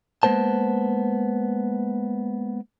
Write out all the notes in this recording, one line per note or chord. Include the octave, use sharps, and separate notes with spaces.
G#3 A#3 B3 C5 A5